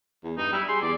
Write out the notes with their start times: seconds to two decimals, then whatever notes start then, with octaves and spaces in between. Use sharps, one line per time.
0.24 E2
0.37 G2 D#4
0.52 G3 E4
0.68 G#4 C6
0.82 E2 D5